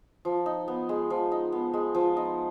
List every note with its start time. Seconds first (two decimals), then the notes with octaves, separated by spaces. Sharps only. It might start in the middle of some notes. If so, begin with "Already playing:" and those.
0.25 F3
0.46 D#4
0.68 B3
0.89 G#3
1.10 F3
1.32 D#4
1.52 B3
1.73 G#3
1.95 F3
2.17 D#4